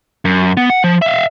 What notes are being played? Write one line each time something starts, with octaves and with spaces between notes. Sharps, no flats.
F#2
B3
F#5
F3
E5 F5